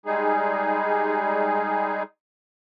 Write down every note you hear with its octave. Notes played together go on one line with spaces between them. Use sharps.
G3 G#3 D#4 G#4